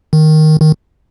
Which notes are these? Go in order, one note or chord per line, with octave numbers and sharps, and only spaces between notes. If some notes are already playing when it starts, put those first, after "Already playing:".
D#3
D#3